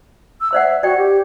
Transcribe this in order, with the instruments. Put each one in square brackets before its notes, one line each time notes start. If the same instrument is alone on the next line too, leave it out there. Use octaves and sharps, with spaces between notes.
[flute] E6
[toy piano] C5 D5 F#5 [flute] E5
[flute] F#4 [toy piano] D5 G5
[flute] G4